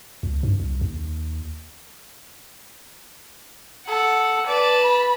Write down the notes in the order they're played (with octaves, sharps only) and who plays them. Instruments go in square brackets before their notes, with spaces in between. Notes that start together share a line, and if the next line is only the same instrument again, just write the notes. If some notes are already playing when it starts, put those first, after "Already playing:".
[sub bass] C#2
G2
C2
D#2
[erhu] A4 [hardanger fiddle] F#5
[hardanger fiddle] B4 A5 [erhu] D5
[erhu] B5